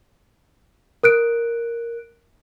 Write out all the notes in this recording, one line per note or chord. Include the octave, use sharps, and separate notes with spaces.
A#4 F#6 D7